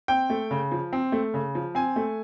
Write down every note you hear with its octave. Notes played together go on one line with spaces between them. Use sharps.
C4 G5
A3
C#3
F3
C4
A3
C#3
F3
C4 G#5
A3